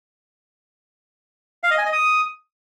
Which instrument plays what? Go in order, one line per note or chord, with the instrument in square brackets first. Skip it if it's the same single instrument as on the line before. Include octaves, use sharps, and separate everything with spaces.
[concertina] F5
D#5
G#5
D#5
D#6